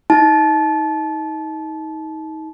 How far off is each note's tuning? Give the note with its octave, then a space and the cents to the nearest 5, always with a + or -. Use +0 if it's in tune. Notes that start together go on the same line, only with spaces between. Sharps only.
D#4 +30 A5 -25